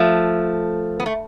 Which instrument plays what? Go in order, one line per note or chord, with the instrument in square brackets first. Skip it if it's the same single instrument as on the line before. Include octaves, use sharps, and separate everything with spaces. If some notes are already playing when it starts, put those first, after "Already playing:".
Already playing: [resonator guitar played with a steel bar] F3 A3
B3
A3